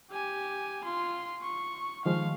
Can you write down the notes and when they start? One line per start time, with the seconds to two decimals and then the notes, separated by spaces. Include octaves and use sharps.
0.11 G4 G#5
0.84 F4 C6
1.42 C#6
2.05 D#3 F3 G#3 F5